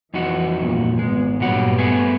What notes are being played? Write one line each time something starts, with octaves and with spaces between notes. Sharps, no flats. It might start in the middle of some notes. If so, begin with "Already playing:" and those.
F2 E3 D#4 F#4
G1 A#2
G#1 G#3 B3
G2 A#2 F#3 F#5
A3 B3 G#4